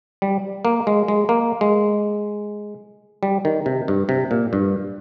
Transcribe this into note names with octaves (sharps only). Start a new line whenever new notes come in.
G3
A#3
G#3
G#3
A#3
G#3
G3
D#3
C3
G2
C3
A#2
G2